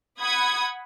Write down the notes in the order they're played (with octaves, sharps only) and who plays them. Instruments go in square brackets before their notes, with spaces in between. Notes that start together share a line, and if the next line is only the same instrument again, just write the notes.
[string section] F#5 B5 D#6 G#6